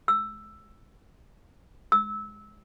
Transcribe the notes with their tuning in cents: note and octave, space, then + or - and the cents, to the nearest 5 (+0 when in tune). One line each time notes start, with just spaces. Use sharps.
E6 +10
E6 -20